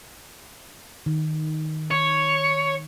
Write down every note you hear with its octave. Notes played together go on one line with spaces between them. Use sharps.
D#3
C#5